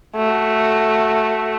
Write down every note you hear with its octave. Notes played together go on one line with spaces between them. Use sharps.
A3 F#4